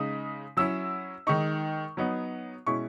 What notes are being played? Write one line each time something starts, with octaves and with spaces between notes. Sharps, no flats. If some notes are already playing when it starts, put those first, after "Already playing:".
Already playing: C#3 G#3 D#4 D#6
F#3 C#4 E4 E6
D#3 G#3 D#4 C#6
F#3 B3 D#4
B2 G#3 C#4 E4 C#6